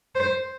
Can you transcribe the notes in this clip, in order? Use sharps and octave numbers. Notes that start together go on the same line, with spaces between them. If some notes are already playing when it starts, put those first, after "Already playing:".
C5